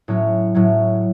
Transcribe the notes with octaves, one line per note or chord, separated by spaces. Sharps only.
A2 F#3 C#4
A2 F#3 C#4